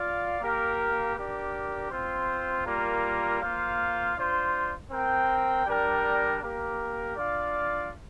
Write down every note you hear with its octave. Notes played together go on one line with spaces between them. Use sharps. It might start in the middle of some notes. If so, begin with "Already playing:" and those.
Already playing: F4 D5 F5
A#3 G4 A#4 F5
D4 G4 A#4
C4 F4 C5
G3 A#3 F4 A#4
A#3 F4 C5 F5
D4 F4 C5
C4 A#4 G5
G3 D4 A#4 G5
A#3 G4 A#4
D4 F4 D5 F5